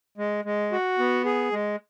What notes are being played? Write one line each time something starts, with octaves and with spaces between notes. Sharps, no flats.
G#3
G#3
F#4
B3
G#4
G#3